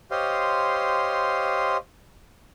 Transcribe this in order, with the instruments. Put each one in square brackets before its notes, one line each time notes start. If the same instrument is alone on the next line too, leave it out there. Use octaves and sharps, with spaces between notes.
[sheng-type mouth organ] G4 C5 C#5 D#5 F5 C6